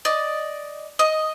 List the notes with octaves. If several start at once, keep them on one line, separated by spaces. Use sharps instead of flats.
D5 D#5
D#5